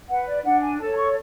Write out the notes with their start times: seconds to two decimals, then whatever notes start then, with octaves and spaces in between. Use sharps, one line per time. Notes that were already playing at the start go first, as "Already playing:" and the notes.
0.09 B4 F#5
0.26 D5
0.44 D4 F#5
0.62 G#5
0.79 A4 C#5 A5
0.97 C#6